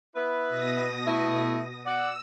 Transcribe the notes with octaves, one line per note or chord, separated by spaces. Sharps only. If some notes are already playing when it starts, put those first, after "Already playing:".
B3 E4 B4
B2 D#6 A#6
A3 E4
D5 F#5 E6